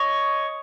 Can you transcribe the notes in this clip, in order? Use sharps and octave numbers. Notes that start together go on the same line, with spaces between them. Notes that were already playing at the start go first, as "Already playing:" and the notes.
Already playing: C#5 D#5